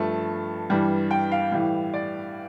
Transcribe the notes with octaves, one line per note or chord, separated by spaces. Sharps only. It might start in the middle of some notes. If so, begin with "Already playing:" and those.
Already playing: G2 F3 A3 A5
G2 E3 G3
G5
F5
A2 E3 G3
D5